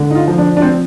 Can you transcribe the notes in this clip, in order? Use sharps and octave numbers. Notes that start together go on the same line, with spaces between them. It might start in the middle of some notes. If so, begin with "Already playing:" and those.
Already playing: D3
D#4
F4
F3
D4
D4
C4